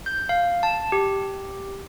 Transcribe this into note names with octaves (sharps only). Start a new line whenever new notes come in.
G6
F5
A5
G4